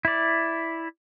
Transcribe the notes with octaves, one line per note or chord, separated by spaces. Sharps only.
E4 D5